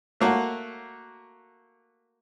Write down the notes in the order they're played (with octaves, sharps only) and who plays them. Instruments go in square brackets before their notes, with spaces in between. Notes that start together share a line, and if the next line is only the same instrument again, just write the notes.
[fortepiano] A3 A#3 F#4